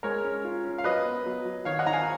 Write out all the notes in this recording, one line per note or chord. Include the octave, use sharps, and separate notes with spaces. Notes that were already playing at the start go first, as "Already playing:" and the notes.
G#3 A#4 C#5
C#4
F4
C#4
F5
F#3 B4 D#5
B3
F#3
F#3
D#3 C#5 F5
D#5 F#5
D#3 A#5
F5 G#5